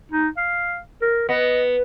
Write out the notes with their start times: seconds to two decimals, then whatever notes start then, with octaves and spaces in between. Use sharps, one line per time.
0.11 D#4
0.37 F5
1.02 A#4
1.29 B3 D#5